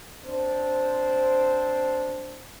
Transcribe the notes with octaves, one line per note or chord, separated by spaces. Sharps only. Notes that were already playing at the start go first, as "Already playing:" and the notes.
C4 D4 C5